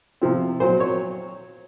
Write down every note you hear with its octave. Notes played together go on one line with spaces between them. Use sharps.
C3 F3 C4
A#2 F#3 C4 C5
C#5